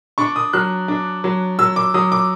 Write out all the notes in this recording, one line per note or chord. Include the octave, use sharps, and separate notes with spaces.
D4 C#6
D#6
F#3 F#6
D4
F#3
F#3 E6
D6
F#3 D#6
D6